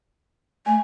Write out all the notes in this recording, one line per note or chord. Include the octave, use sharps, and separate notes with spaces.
A3 G#5